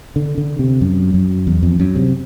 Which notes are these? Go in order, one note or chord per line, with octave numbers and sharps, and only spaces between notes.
D3
D3
C3
F#2
F#2
E2
F2
F#2
C3